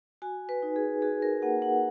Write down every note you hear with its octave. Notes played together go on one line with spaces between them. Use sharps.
F#4 G#5
B4
D#4
G#4
F#4 G#4
A#4
A#3 F#5
F#5